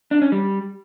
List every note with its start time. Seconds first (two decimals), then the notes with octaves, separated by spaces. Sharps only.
0.11 D4
0.22 C#4
0.32 G3